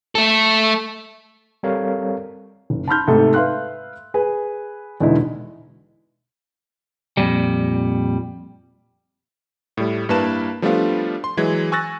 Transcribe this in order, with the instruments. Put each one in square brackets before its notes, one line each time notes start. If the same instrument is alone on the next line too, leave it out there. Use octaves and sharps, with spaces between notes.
[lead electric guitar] A3 A4
[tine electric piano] G3 C4 A4 A#4 C#5 F5
[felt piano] F#1
A5 B5 C6 F6 G6
G#2 C3 A3 A4
B4 E5 F5 C6 F#6
G#4 B4 G#5
E2 B2 D3 G#3 D#4 E4
[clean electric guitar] F2 A#2 G3
[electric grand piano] A2 G3
G2 A#3 E4 B4 A5 E7
F3 G3 A3 B3 D4 F4
C6
E3 F#3 G#3 G#6
G#5 C#6 E6 F#6 A6 A#6